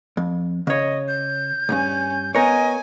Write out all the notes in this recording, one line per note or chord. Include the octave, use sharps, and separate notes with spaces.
F2
C#3 C#5 D#5
G6
B1 G2 C#4 G#5
B3 A#4 C#5 D#5 G#5